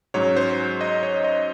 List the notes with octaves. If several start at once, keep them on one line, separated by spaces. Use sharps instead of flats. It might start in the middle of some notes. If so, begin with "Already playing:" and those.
G#2 F#3 C#4 C#5
C5
D#5
C#5
D#5